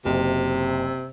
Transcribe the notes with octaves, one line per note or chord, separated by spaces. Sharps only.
F#1 C3